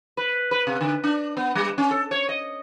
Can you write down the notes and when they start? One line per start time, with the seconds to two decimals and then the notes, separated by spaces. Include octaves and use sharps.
0.17 B4
0.51 B4
0.67 C3
0.81 D3
1.04 D4
1.37 B3
1.55 G3
1.78 C#4
1.91 A4
2.11 C#5
2.29 D#5